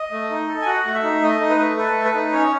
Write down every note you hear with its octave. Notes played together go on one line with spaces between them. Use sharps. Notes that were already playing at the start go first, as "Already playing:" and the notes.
Already playing: D#5
A3
D#4
A4
G#5
F#4 F#5
A3
E5
D#4
A3 D#5
D#4
B4
A3
A4 B4
A3
B4
D#4
C#4 C#5